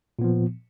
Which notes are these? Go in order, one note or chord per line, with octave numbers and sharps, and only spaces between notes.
A#2 F3 B3